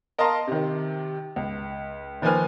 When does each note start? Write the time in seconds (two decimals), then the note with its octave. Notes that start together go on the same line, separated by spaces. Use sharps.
0.18 A#4 D#5 F5 A5 A#5 C6
0.48 C3 D#3
1.36 C#2
2.22 D#3 F3 A#3 B4 G#5 F6